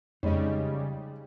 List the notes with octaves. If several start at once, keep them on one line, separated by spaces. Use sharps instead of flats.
F2 C#3 G3 G#3 D#4 C#5 D#5